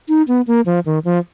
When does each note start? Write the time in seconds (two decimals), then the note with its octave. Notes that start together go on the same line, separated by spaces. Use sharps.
0.09 D#4
0.28 B3
0.47 A#3
0.66 F3
0.86 D#3
1.05 F3